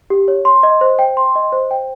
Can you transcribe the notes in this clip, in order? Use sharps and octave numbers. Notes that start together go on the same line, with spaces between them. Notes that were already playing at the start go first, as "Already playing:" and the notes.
G4
C#5
C6
D#5
C5
G5
C6
D#5
C5
G5